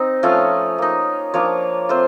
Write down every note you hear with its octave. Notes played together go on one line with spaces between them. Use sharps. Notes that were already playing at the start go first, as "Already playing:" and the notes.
Already playing: C4 D#4
F3 A3 C#4 F4
A#3 D#4
F3 A#3 D4 F4 C#5
A3 C4 F4 C5